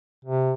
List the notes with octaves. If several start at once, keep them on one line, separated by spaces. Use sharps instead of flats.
C3